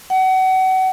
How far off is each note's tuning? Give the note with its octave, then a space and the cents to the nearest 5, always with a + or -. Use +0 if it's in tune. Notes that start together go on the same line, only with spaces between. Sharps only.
F#5 +30